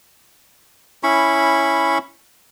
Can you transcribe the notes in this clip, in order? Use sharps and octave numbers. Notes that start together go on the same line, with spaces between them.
C#4 E4 B5 C#6